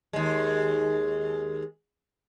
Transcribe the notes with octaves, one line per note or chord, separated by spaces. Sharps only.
D#2 G#3